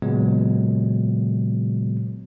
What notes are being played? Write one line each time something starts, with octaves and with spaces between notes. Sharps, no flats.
A#2 C#3 F#3 G#3 B3